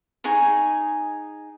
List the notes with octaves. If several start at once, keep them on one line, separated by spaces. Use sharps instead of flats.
D#4 G#4 G#5 C#6